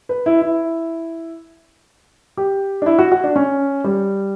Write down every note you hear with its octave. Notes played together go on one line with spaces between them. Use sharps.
B4
E4
E4
G4
D4
E4
F#4
F#4
D4
C#4
G3